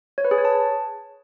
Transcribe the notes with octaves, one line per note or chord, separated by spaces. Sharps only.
C#5
B4
G#4
C#5
A5